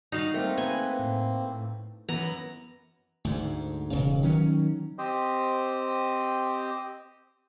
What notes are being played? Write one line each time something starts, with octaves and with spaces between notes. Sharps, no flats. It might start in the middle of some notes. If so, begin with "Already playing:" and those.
G3 D#4 F#4 F5
A3 A#3 C4 A#4
B3 B4 G#5
A2
F#2 E3 B3 A#5
D2 G#2
E1 C#3
D#3 F#3 C#4
C4 G4 C5 D#5